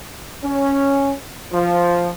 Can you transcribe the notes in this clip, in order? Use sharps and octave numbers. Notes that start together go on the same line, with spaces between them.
C#4
F3